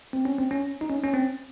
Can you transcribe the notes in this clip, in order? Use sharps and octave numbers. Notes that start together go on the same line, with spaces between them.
C4
C#4
C4
C#4
D#4
C#4
C#4
C4